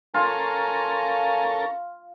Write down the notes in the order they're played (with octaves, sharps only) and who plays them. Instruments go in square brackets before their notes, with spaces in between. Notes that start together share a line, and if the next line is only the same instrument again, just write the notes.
[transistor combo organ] C#4 A4 A#4 [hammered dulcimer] F4 [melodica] G#5 A#5